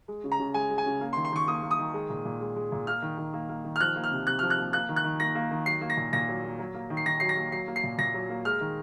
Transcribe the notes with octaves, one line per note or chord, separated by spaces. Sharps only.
G#3
C#3
A#5
C#3
G#3 G#5
G#3
G#5
C#3
A#3
C6
D#3
C6
D#3 C#6
A#3 D#6
A#3
D#6
D#3
G#3
A#2
A#2
G#3
G#3
A#2
A#3 F6
D#3
D#3
A#3
A#3
D#3
F6
F3 F#6
A#3
F6
C3
C3 F#6
F3 F6
F#6
A#3
A#3 F#6
D#3
F#6
D#3
A#3 A#6
A#3
D#3
F#3 C7
A#3
A#6
A#2
A#2 A#6
F#3
A#3
F#3
A#3
D#3
C7
D#3 A#6
F#3 C7
A#6
A#3
F#3 C7
A#3
C7
A#2
A#2 A#6
F#3
A#3
G#3 F6
D#3